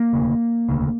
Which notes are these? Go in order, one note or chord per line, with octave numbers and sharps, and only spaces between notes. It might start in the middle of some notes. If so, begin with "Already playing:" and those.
Already playing: A#3
E1 D2 C#3
E1 D2 C#3